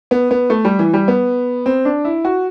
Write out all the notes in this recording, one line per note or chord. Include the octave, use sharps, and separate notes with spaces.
B3
B3
A3
G3
E3
G3
B3
C4
D4
E4
F#4